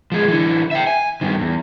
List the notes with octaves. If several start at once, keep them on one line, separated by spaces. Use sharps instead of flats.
F3 G#3
D3 E3
E5 G5
G#5
G2 D#3
E2